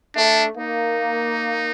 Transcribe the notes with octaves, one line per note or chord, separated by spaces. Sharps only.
A3 D4
A#3 D#4